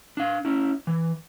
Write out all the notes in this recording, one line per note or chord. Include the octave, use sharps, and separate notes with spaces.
D4 F5
C#4 E4
E3